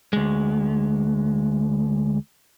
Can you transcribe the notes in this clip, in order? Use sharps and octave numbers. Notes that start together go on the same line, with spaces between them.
D2 G#3